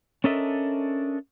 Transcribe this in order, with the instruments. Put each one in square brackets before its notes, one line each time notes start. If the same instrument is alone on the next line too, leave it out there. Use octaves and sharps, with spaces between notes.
[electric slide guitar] C#4 D4 A4 A#4 D#5 E5